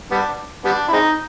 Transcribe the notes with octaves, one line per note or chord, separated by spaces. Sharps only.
G3 B3 D4
G3 B3 D4
E4
G#3 C4 D#4